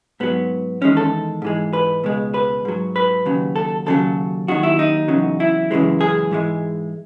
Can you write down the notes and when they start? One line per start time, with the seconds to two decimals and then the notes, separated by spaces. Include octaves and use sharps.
0.20 G#2 F#3 B3
0.81 E2 D#3 G#3 C#4
0.97 A4
1.42 G#2 E3 G#3
1.73 B4
2.04 C#2 B2 G#3
2.34 B4
2.65 G#2 F#3
2.96 B4
3.25 D#2 C#3 F#3
3.56 A4
3.86 D#2 C#3 F#3 A4
4.48 D#2 D#3 F#3 F#4
4.63 E4
4.79 D#4
5.08 E2 C#3 F#3
5.40 E4
5.71 F#2 C#3 E3 G#3
6.01 G#4
6.31 G#2 E3 G#3